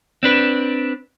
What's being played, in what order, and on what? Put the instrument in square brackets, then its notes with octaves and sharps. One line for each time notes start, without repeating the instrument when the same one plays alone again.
[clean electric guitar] C4 D4 B4